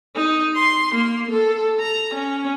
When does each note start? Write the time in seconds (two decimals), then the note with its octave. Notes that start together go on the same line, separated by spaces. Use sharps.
0.16 D#4
0.55 C6
0.94 A#3
1.30 A4
1.80 A#5
2.14 C#4